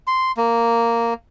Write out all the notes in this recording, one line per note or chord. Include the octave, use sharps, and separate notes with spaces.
C6
A#3